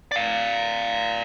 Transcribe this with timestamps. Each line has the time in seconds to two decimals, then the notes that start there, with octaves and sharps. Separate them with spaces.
0.11 D5 F5